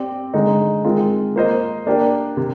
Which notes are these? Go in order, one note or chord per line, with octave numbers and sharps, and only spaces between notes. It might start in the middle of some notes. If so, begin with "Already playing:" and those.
Already playing: C4 G4 D5
D3 G#3 D#4
D#3 G#3 C4 F4
A#3 F4 C5 D#5
A#3 D4 G4
C3